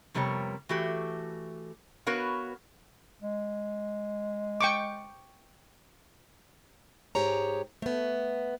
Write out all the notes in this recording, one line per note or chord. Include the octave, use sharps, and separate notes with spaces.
F2 C3 G3 B3 A#4 C#5
E3 A3 F#4 G4
B3 F#4 A#4 B4 C#5 F5
G#3
G5 C#6 D6
G#2 G4 G#4 C#5 A#5
A3 B3